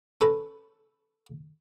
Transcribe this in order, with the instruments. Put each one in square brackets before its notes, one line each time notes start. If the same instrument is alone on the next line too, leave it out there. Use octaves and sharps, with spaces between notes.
[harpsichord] C#4 A4 B4